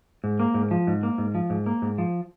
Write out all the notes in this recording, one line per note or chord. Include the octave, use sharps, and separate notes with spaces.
G#2
A#3
G#2
F3
G#2
A#3
G#2
F3
G#2
A#3
G#2
F3